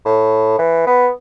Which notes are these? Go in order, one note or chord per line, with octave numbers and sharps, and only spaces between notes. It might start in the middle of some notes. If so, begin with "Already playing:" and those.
A2
E3
B3